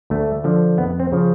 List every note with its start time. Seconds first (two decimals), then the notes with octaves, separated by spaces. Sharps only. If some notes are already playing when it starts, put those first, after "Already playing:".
0.10 D2 A3
0.44 D3 F3
0.78 F2 B3
1.00 C4
1.12 C#3 F3